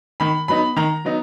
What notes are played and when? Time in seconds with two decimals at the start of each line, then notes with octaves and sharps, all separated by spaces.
0.20 D#3 B5
0.48 F#3 B3 D#4 B5
0.77 D#3 A#5
1.05 F#3 B3 D#4